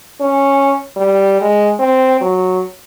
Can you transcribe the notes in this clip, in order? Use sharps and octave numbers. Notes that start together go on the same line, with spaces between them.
C#4
G3
G#3
C4
F#3